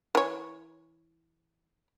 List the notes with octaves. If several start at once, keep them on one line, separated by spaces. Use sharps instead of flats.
E3 C#5